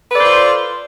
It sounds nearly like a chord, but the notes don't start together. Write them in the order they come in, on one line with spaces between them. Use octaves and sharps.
B4 A4 D5 C5 F4